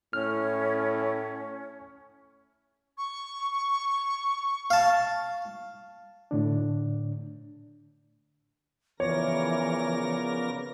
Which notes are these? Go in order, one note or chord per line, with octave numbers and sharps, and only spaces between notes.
A2 C#4 F6
C#6
F5 A5
A2 D3 D4
C#3 E3 F3 B3 A#4 C#5 D5 A#6